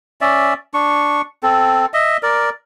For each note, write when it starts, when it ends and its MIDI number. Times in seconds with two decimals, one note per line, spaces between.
0.21 0.54 61
0.21 0.54 74
0.21 0.54 76
0.74 1.22 62
0.74 1.22 85
1.43 1.86 60
1.43 1.86 69
1.94 2.17 75
1.94 2.17 76
2.23 2.50 70
2.23 2.50 74